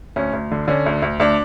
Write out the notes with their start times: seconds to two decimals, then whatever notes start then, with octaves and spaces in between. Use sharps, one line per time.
0.16 D2 C#4
0.33 D2
0.52 D3
0.68 D3 C#4
0.86 D2
1.02 D2
1.20 D2 D4